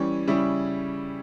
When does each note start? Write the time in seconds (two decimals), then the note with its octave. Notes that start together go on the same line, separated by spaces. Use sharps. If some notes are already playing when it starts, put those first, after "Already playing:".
Already playing: E3 G3 C#4
0.27 C#3 G3 C#4 E4